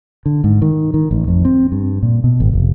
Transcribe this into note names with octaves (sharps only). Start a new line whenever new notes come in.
D3
G#2
D#3
D#3
A1
F2
C4
G2
A#2
B2
G#1
F1